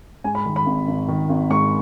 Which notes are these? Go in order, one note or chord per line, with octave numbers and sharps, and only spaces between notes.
G#2 G#5
B5
D#3
B5
G#1
G#1
D#3
G#1
G#2 C#6